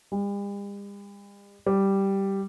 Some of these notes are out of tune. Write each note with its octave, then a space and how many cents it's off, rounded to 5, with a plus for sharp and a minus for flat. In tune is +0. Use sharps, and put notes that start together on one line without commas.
G3 +45
G3 -5